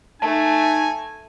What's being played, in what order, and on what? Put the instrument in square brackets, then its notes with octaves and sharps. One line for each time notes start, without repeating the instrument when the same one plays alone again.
[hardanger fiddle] A3 [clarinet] D#4 [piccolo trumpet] G#5 [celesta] A5